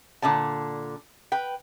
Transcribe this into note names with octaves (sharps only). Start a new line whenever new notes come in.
A#2 D3 C#4 D5 A5
B4 G5